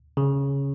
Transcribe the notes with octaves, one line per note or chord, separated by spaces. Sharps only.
C#3